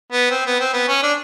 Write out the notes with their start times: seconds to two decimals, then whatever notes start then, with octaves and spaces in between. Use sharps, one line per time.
0.12 B3
0.31 C4
0.46 B3
0.60 C4
0.74 B3
0.88 C#4
1.03 D4